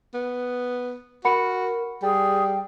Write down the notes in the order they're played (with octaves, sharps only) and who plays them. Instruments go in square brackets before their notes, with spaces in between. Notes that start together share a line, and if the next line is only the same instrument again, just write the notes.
[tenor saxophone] B3
[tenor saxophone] F#4 [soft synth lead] A#4 [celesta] F#5 B5 C#7
[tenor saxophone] G3 [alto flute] G#4 [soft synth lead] G5